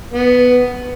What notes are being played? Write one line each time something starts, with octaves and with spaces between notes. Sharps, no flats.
B3